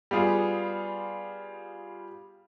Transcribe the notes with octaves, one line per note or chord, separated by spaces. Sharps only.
G3 B3 F4 G#4